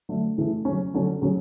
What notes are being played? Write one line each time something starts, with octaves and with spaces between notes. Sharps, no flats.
D3 F#3 A3
C#3 E3 A3
C#3 F#3 C#4
D3 F#3 C#4
C#3 F#3 C#4